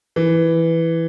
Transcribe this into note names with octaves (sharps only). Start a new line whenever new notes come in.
E3